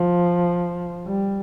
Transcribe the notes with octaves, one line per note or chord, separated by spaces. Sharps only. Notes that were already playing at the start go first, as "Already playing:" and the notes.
Already playing: F3
G3